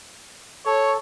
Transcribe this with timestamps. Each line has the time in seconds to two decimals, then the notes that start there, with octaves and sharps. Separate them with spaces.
0.66 A4 C#5